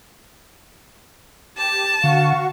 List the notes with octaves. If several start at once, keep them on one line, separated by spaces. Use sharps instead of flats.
G4 A5
D3 F#4 F5 C#6